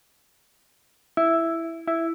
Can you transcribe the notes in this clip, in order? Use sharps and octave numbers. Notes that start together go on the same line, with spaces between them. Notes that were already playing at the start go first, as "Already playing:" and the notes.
E4
E4